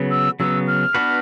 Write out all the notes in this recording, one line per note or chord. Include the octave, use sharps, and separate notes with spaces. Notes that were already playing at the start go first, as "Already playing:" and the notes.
Already playing: C#3 F#3 B3
E6
C#3 F#3 B3 E6
F6
B3 D4 F#4 B4